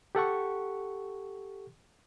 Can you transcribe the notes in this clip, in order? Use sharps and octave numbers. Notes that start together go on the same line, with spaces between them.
G4 A4 F#5 C#6